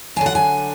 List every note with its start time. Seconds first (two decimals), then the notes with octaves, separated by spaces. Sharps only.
0.16 D3 F#3 D4 G#5
0.26 F#5
0.35 G#5